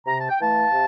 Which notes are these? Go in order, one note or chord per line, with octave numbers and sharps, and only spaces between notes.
C3 A#5
A5
G5
E3 A3 F5 A5
C3